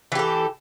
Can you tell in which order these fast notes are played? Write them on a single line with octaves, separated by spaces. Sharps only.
E3 G4 A4